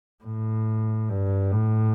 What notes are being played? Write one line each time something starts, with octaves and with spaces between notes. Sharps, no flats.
A2
G2
A2